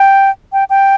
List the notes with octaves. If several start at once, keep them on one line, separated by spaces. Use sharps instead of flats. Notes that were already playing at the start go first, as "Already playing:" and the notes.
Already playing: G5
G5
G5